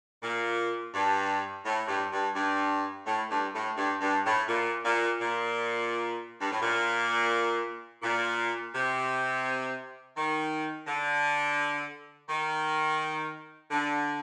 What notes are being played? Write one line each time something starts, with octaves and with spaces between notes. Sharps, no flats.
A#2
G2
A2
G2
G2
G2
A2
G2
A2
G2
G2
A2
A#2
A#2
A#2
G2
A2
A#2
A#2
C3
D#3
D3
D#3
D3